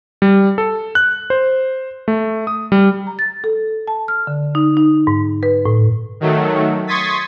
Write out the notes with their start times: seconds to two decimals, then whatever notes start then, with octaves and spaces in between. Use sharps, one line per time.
0.22 G3
0.58 A4
0.95 F#6
1.30 C5
2.08 A3
2.47 D#6
2.72 G3
3.07 A#5
3.19 A6
3.44 A4
3.88 A5
4.08 F6
4.27 D3
4.55 D#4
4.77 D#4
5.07 G#2
5.43 B4
5.66 A2
6.20 D#3 F#3 A3
6.87 C6 C#6 D#6 G#6 A6 B6